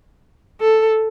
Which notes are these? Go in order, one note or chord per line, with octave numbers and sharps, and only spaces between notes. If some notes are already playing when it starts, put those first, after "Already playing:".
A4